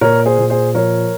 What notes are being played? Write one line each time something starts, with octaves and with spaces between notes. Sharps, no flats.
A#2 A#4 C#5
G#4 C5
A#2
G#4 C5
F3 A#4 C#5